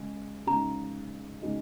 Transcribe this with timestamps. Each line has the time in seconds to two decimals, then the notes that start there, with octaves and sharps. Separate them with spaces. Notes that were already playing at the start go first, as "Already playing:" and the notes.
Already playing: C#3 G#3
0.47 C#3 G#3 D#4 A#5
1.42 C#3 G#3 D#4